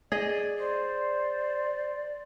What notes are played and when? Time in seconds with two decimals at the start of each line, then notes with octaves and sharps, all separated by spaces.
0.12 G#4 D5 D#5
0.59 C5 D5